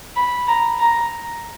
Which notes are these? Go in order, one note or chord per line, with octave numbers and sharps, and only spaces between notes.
B5
A#5
A#5